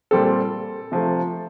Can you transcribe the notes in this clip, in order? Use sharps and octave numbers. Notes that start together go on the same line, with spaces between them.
A#2 G3 C4 A4
C3 F3 A3